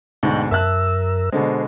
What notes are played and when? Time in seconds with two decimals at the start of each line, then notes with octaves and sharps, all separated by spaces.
0.23 D2 G#2 B2 F#5 G5
0.51 F#2 A#4 E5 A5 E6 F#6
1.32 B2 D3 G#3 C5